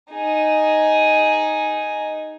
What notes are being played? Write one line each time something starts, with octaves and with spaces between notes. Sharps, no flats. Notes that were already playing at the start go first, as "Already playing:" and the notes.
D#4 G#4